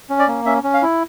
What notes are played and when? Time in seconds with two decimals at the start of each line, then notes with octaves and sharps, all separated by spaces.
0.10 C#4
0.19 D5
0.28 A#3
0.46 C#4 E5
0.64 C#4
0.74 F5
0.82 E4